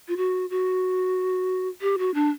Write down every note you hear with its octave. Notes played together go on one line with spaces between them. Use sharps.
F4
F#4
F#4
G4
F#4
D4